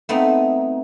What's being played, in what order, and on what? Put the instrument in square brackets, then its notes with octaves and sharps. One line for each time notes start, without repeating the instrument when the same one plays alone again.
[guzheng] A3 B3 C4 D#4